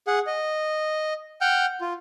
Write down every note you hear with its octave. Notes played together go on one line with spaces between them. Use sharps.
G#4 F#5
D#5
F#5 G5 F6 G6
F4